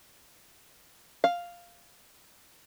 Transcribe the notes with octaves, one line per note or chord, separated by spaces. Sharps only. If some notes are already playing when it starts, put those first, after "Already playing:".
F5